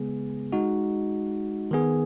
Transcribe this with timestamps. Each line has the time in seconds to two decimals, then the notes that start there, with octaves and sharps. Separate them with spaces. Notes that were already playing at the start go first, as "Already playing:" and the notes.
Already playing: C#3 G#3 B3 G#4
0.53 G#3 D#4 F#4
1.71 D#3 B3 G#4